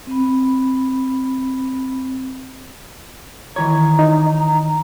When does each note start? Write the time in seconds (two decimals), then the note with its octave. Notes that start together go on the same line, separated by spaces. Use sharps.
0.07 C4 B5
3.56 D#3 E3 C#5 A#5
3.99 D#4